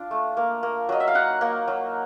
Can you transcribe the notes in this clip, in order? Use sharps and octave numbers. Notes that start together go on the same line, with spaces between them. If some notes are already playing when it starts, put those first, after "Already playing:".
Already playing: D4 F4
A3
A#3
A#3
F#3 D#5
E5
F5
D#4 F#5
A#3
F#3